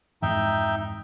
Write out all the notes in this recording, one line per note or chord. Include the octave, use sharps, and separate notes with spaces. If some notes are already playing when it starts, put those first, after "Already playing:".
F2 G#2 E3 D#4 E5 G5